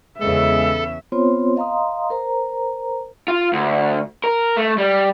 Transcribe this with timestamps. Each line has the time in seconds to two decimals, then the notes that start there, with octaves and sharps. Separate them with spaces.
0.20 E2 C#3 G#3 B3 A4 E5
1.12 B3 C4 F4 C5 C#5 C6
1.56 D#5 F5 A#5 C6 D#6
2.10 A#4 C5 A#5
3.28 F4
3.53 D2
4.24 A#4
4.57 A3
4.78 G3